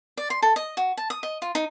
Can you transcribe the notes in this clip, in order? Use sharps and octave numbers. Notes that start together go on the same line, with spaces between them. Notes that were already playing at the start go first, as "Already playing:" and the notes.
D5
C6
A4
D#5
F#4
A5
D#6
D#5
F4
D#4